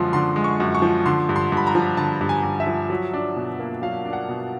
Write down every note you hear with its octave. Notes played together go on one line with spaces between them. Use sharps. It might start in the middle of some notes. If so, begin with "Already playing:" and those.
Already playing: F#2 D3 F3 G#3 C6
D3 C6
G#3
C#6
F#2
C#6
F3
D3 C6
G2
C6
G2 B5
A#5
F3
D3 A5
G2
G#5
G2
E5
F3
F#3
D4
B2
A#3
F#3 F5
D4
F#5
B2